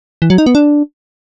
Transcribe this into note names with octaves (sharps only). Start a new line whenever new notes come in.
E3
F#3
D#4
B3
D4